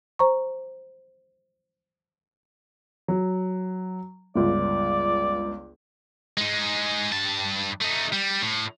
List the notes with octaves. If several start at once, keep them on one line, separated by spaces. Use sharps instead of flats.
C5 A#5 C#6
F#3
G1 C#2 D5
G#3 D#4
G2 A5
A3 D#4
G3
A2